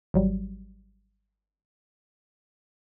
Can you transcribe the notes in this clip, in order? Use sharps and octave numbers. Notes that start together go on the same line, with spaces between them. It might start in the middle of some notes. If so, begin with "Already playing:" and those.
G#1 F#3 G3